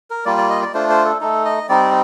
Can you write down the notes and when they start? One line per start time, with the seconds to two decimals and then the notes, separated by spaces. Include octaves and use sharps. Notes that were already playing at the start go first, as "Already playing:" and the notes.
0.10 A#4
0.25 G3 A#3 F4 D5
0.38 D5
0.50 D#5
0.62 D5
0.74 A3 D4 F4 C5
0.90 C5
1.05 A4
1.21 A3 D#4 A4
1.45 D#5
1.69 G3 C4 D#4 D5